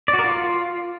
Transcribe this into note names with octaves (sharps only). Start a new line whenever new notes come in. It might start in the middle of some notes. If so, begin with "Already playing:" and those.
D5
F#4
A#4
F4